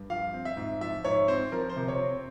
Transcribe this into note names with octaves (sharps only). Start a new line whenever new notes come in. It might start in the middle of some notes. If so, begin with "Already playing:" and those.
Already playing: G2
F3 F5
C4
E5
G#2
F3 E5
G#2 C#5
C4 C5
F3 A#4
C5
C3
C#5
C4